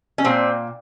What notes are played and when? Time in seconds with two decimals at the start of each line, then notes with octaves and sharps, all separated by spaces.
0.18 C#4
0.24 A#2 C4